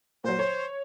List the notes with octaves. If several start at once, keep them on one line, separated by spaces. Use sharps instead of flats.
A#2 F#3 C5
C#5